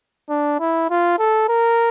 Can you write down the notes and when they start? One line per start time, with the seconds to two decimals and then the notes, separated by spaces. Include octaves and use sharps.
0.29 D4
0.60 E4
0.90 F4
1.19 A4
1.49 A#4